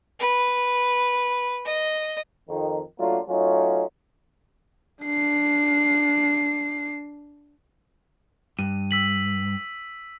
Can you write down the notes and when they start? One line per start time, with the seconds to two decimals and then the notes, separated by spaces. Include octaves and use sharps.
0.20 B4
1.65 D#5
2.50 F2 D#3
3.00 F#3 A3 A#3 D4 F4
3.29 F#3 A3 C#4 D#4 F4
5.03 D4 C7
8.59 G2 D#7
8.91 E6 B6 F#7